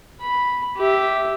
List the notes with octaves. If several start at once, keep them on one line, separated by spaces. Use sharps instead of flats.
B5
G4 E5